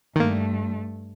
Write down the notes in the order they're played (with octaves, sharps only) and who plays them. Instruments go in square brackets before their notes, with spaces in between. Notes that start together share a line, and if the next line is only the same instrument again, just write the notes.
[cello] G2 A3 [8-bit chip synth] D#3 A#3